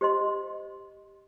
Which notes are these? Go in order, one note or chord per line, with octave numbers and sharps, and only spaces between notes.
G4 C5 D#5 C6